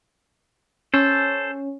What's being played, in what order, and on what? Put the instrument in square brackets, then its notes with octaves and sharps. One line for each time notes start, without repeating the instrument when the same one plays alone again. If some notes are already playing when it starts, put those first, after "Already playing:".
[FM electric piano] C#4 [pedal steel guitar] A4 C5